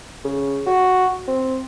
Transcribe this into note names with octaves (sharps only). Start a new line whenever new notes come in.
C#3
F#4
C4